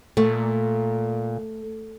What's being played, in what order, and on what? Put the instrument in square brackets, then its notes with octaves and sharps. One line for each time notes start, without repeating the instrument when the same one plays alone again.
[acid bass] A#2 [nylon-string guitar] A3